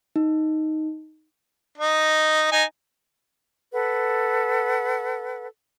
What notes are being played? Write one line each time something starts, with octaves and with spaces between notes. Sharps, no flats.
D#4
D#4 D#5
D#4 G#5 A#5
A4 B4 F#5